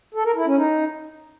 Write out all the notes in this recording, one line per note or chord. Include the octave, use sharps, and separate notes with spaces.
A4
A#4
E4
C#4
D#4